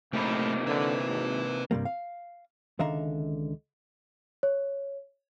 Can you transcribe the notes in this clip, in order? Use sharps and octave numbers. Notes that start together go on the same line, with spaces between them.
F#1 C3 A3 A#3 D#4 B5
D3 B4 E5
G#1
G2 C3 G3 A#3
F5
C#2 D3 D#3 E5 F5 A#5
C#5